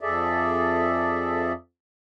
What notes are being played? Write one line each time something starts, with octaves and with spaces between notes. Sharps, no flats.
F2 G#4 A4 D5 E5